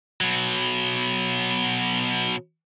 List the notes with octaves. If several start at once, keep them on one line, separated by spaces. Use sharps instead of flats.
B2 F#3